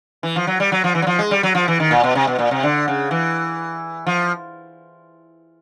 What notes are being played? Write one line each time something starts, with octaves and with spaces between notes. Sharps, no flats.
E3
F3
F#3
G3
F#3
F3
E3
F#3
F3
G#3
G3
F#3
F3
E3
D#3
A#2
B2
C3
B2
A#2
C3
D3
C#3
E3
F3